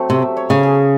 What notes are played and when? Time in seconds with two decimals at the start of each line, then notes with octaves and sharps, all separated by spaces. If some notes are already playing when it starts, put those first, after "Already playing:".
Already playing: F#3 A3 C4
0.10 C3 E5
0.37 C#5
0.50 C#3
0.63 G#4